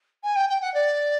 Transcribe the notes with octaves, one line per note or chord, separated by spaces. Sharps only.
G#5
G5
G5
F#5
D5